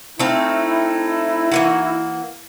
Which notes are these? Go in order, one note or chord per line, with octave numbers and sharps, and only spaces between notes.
A3 C4 D#4 E4 F5
E3 A#3 F#4